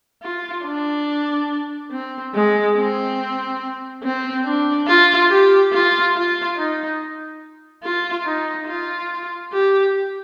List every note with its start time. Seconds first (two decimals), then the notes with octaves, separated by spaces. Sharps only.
0.23 F4
0.66 D4
1.91 C4
2.35 G#3
2.77 C4
4.04 C4
4.46 D4
4.87 F4
5.29 G4
5.73 F4
6.15 F4
6.57 D#4
7.83 F4
8.26 D#4
8.67 F4
9.53 G4